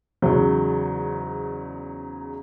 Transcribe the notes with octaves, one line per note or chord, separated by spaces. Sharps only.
E2 G#2 C#3 F#3